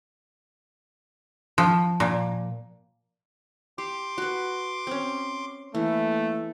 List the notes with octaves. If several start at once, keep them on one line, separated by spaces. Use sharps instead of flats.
F3
A#2
G4 C6 D6
F#4 B4
C4 C#4
E3 A3 A#3